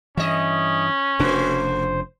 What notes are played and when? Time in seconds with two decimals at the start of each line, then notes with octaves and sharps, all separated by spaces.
0.17 G2 E3 C#4 D#5 E5
1.19 F1 C#3 A3 D4 F#4 C5